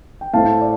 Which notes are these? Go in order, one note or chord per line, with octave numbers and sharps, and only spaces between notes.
G5
A2 A3 C4 F5 A5
D5